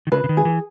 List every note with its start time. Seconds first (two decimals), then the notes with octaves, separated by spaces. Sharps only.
0.07 D#3
0.12 C#3 B4
0.24 C#3
0.29 D#3
0.37 G#4
0.45 E3